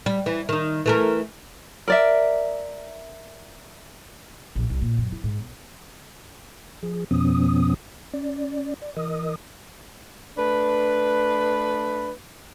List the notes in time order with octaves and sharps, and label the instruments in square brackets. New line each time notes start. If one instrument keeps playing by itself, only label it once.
[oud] G3
E3
D#3 D#4
E3 A3 A#4
[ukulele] A#4 D5 E5
[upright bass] A#1
C2
A#2
F#2
E4
G#2
B1
[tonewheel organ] F3 G#4
F2 B2 F3 B3 C#4 D#6
C#4 D5
D5
E3 A#4 D#5 D#6
[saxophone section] A3 D4 B4